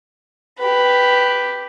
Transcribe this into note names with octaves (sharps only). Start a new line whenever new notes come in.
G4 B4